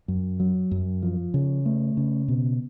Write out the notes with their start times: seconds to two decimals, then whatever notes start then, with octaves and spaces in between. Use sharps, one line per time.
0.08 F#2
0.40 F#3
0.71 F#2
1.02 F3
1.34 C#3
1.66 A3
1.97 C#3
2.28 B2